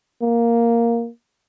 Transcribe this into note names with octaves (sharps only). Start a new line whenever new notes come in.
A#3